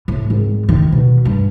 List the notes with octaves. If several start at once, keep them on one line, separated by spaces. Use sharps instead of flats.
A2
G#1
D#3
B2
G2